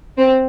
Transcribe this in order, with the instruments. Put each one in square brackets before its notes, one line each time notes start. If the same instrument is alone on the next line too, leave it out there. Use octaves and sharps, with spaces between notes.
[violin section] C4